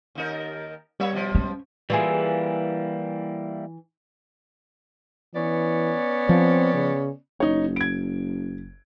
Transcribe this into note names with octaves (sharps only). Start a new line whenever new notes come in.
D#2 D#4 A#4
G3 A#3 C#5 E5
B2 F3
C#4
E3 G3 A#3 E4 F4 G#4
E3 B3 C#4 D5
F3 C4
C#3
F#1 D#4 C#5
G#6 D7